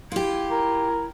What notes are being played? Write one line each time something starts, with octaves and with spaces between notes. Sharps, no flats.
E4 F4 G4
A#4